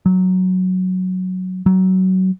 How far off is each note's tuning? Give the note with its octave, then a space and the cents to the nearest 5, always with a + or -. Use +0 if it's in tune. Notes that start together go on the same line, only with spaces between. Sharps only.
F#3 +0
F#3 +20